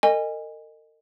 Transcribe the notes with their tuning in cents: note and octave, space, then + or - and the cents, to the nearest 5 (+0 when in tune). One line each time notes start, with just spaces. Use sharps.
A#4 -45 D#5 -15 G#5 -25